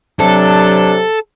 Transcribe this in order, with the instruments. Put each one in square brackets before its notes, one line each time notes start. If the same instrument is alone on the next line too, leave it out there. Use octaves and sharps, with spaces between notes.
[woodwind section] C3 F#3 [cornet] D4 [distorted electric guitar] A4